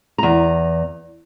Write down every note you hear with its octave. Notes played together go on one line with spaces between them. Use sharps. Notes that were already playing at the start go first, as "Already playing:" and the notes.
E2 A#5